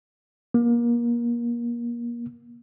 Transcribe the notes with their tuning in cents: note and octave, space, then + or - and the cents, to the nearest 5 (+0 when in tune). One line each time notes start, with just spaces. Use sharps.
A#3 +30